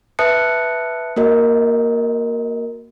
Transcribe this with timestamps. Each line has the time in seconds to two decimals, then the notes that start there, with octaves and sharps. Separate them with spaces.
0.19 B4 E5 A5 D#6 F#6 C#7
1.16 A#3 F#4 A#4 D#5